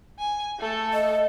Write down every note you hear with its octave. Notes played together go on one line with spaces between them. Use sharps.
G#5
A3 A4
D#5